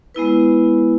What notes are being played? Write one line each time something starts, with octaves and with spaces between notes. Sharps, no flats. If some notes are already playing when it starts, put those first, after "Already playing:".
G#3 B3 E4 B4